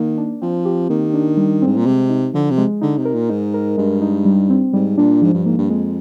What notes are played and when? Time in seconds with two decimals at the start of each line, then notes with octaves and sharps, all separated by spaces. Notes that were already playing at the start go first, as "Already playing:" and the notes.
Already playing: D#3 A#3
0.18 D4
0.41 F3 C4
0.65 G4
0.89 D#3 A#3
1.14 D4
1.37 G3
1.62 G#2 C4
1.76 A#2
1.85 C3 G#3
2.09 D#4
2.34 D3 F3
2.50 C3
2.57 G#3
2.81 D3 D#4
2.97 C3
3.05 A#4
3.14 A#2
3.29 G#2 D#4
3.54 A#4
3.77 G2 G#3
4.01 D#4
4.25 G3
4.50 C4
4.73 G#2 G3
4.97 A#2 D4
5.22 G#2 F3
5.34 G2
5.45 G#2 A#3
5.58 G2
5.70 F2 G#3